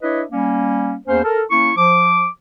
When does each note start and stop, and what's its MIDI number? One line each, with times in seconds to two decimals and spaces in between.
0.02 0.22 62
0.02 0.22 64
0.02 0.22 71
0.02 0.22 73
0.02 0.22 75
0.02 0.22 76
0.32 0.95 55
0.32 0.95 58
0.32 0.95 61
1.07 1.23 40
1.07 1.23 58
1.07 1.23 61
1.07 1.23 72
1.24 1.43 69
1.24 1.43 70
1.51 1.71 58
1.51 1.71 61
1.51 1.71 64
1.51 1.71 85
1.76 2.27 53
1.76 2.27 86